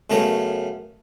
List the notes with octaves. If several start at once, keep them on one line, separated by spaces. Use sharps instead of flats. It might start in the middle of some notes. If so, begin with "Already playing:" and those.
F#2 C#3 A3 B3 A#4 C#5